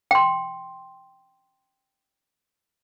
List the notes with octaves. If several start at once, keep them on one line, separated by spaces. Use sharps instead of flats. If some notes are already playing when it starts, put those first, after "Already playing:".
G5 C6